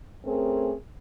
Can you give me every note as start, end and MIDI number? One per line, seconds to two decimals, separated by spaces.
0.25 0.73 57
0.25 0.73 60
0.25 0.73 61
0.25 0.73 68
0.25 0.73 70